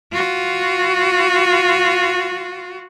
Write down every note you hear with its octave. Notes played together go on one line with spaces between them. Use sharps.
F4 F#4